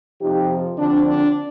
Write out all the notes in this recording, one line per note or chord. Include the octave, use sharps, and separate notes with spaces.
F2 C3 F3 D#4 G4
D3 F3 C4 D4
D4